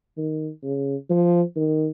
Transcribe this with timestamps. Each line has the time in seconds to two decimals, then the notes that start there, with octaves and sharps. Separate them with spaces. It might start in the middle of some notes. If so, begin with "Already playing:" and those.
0.17 D#3
0.63 C#3
1.10 F3
1.56 D#3